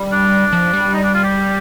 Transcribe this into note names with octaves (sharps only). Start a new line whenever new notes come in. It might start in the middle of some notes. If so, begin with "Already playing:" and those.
Already playing: G3
D4
F3
G3
D#4
D4
F4
G4